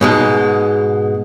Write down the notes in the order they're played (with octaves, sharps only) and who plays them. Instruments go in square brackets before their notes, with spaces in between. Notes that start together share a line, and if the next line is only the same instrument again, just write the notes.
[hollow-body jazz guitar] G#2 B2 G#3